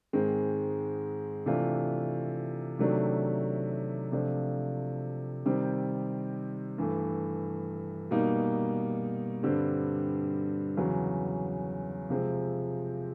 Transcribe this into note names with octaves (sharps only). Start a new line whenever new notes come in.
G#2 D#3 G#3 C4
C3 E3 A3 D4 F4
C3 D#3 F#3 A3 D4
C3 F3 A3 D4 F4
C3 D#3 G3 C4
G2 E3 A3
B2 G3 A#3 D#4
G2 D3 G3 C4
E2 C#3 F#3
C3 F3 G#3 C4